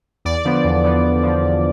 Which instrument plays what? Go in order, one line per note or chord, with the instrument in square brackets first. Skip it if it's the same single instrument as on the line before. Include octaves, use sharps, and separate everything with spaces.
[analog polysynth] E2 D5
D3 F3 B3
E2
D3 F3 B3
E2
D3 F3 B3
E2